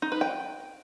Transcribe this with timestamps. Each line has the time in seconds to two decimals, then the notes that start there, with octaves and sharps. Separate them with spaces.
0.02 D#4
0.12 B4
0.21 G5